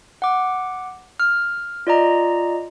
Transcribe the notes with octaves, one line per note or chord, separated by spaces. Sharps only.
F#5 D6
F6
F4 D5 D#5 A#5